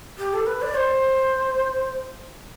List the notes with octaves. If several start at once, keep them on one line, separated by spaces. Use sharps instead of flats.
G4
A4
B4
D5
C5